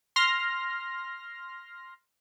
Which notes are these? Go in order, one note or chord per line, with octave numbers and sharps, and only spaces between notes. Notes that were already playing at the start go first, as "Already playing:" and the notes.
C6 F6 A#6